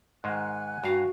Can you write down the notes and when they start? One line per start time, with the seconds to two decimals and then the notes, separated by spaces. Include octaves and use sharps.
0.24 G#2 D#3 G#3 F#5 G#5 F#6
0.84 G2 F#4 F5 A#5